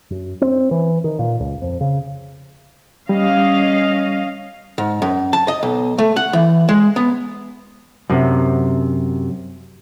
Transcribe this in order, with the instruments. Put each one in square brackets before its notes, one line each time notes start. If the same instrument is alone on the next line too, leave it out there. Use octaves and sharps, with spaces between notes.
[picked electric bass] F#2
C4
E3
D#3
A#2
C#2
F2
C#3
[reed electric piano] G3 [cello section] C#4 D#5 F5
[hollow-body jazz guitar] G#2
F#2
A5
D#5
B1
A3
F#5
E3
G#3
B3
F#2 C3